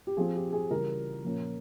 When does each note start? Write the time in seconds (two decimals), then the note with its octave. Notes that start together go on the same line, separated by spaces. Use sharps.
0.07 G4
0.17 F3 C4 G#4
0.35 G4
0.53 G#4
0.71 C#3 E3 G3 A#4
1.24 A#2 F3 A#3 C#4